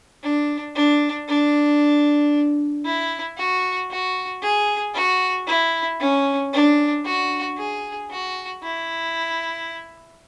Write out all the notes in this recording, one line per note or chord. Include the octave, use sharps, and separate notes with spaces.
D4
D4
D4
E4
F#4
F#4
G#4
F#4
E4
C#4
D4
F#4
G#4
F#4
E4